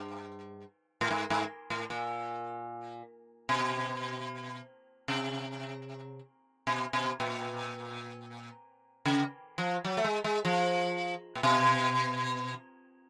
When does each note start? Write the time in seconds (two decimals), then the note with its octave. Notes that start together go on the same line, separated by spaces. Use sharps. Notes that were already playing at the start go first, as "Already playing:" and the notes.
Already playing: G2
1.01 A2
1.11 G#2
1.30 G#2
1.70 A2
1.90 A#2
3.49 B2
5.08 C3
6.67 B2
6.93 B2
7.20 A#2
9.05 C#3
9.58 F3
9.85 F#3
9.97 A3
10.04 G#3
10.24 G#3
10.45 F3
11.35 A#2
11.43 B2